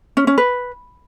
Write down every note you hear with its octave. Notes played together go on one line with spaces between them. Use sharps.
C#4
C#4
B4